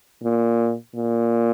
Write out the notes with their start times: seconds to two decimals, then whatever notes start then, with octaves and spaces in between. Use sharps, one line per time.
0.23 A#2
0.95 A#2